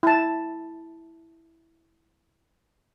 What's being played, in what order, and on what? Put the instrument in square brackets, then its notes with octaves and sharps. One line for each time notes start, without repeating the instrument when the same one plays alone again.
[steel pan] E4 A5